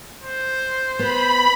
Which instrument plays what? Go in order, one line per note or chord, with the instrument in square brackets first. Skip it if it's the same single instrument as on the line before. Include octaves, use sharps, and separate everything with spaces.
[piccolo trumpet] C5
[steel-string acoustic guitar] B3 [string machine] B5